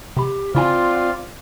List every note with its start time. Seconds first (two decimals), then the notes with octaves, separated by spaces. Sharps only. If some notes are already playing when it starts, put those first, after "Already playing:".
0.17 C3 G4 B5
0.55 C#3 C4 E4 F4 D5 F5 G#5
0.95 F#5